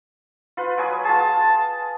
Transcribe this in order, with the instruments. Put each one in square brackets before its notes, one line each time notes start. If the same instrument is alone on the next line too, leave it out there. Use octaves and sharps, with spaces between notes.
[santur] F4 B4
F#3 G#5 D#6
[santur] F4 G#4 [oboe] A5